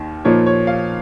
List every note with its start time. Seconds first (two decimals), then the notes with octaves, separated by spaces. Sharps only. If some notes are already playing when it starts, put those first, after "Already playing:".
Already playing: D#2 D#3
0.25 A#2 F3 A#3 D#4 C#5
0.46 C#5
0.67 F5